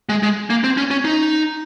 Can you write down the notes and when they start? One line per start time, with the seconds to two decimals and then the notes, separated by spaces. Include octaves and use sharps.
0.09 G#3
0.23 G#3
0.50 A#3
0.64 C4
0.77 C#4
0.91 C#4
1.05 D#4